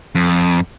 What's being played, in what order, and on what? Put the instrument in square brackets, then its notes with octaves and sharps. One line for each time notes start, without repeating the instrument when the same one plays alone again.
[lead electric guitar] F2